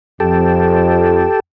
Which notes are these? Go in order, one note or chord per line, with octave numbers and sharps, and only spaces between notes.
F2 G4 A4